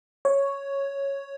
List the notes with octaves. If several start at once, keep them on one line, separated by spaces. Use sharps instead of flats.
C#5